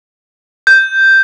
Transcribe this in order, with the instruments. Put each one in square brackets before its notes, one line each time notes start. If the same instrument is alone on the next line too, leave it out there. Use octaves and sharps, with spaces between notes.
[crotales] G6